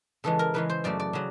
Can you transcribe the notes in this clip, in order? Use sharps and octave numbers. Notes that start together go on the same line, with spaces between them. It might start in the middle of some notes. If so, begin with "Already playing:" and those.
C#3 E3 G#3 A4
A#4
C#3 E3 G#3 B4
C5
F#2 C#3 F#3 A3 D5
D5
C#3 F#3